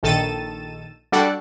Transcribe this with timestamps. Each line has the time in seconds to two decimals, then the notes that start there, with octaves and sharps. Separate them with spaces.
0.03 A#1 D#3 A4 A6 D#7 E7
1.12 G3 D4 F#4 A4 D5 F#5